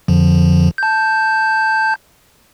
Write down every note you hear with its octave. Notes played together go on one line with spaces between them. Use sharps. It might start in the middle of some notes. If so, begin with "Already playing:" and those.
F2 D3 F3
A5 G6